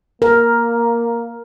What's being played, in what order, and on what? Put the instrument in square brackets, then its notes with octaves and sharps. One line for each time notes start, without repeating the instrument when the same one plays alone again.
[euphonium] A#3 [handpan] A#4